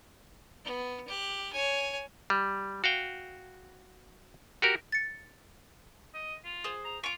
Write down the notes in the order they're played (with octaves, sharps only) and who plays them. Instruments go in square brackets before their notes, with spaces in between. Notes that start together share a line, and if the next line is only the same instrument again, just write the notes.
[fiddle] B3
G4 F#6
C#5 G#5
[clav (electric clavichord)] G3
F#4 F5 G5
F#4 G4 A#4
[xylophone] A6 C#7
[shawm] D#5
F4
[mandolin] G#4 C5
[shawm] A#5
[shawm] F4 [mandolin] C#6 D6